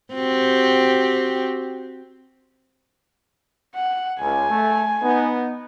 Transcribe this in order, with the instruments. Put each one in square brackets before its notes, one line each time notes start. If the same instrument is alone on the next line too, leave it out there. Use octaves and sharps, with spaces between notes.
[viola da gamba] C4 F#4 G4
[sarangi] F#5
[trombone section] C#2 [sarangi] G#5
[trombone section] A3
B3 D#4